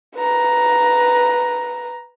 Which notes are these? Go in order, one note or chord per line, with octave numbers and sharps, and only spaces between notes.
B4 A#5